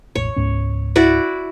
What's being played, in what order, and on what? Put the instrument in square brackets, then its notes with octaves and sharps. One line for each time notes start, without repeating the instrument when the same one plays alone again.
[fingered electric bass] E1 A1 [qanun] C#5
[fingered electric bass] C#2 G#2 C#4
[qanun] E4 F#4 D5